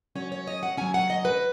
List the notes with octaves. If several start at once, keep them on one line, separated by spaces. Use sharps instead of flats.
F#3 C#4 C#5
C#5
D#5
F#5
F#3 C#4 G#5
F#5
D#5
B4